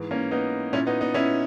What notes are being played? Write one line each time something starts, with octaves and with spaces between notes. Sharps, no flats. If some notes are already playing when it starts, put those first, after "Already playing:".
Already playing: G#2 E3
A#3 C#4
B3 D#4
A#2 C#4 E4
B3 D#4
B3 D#4
C#4 E4